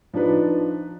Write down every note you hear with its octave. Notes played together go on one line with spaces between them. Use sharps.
F3 D4 D#4 B4